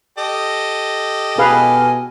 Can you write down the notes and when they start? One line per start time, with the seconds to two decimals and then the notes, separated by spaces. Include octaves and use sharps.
0.18 G4 A4 D#5
1.38 B2 G#4 B4 F5 G#5 F6